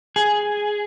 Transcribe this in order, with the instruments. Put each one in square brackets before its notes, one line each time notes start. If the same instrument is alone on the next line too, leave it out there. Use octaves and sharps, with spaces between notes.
[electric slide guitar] G#4